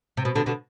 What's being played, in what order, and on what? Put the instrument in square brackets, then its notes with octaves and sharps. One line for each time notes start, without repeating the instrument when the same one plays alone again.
[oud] C3
B2
B2 D3
B2 D3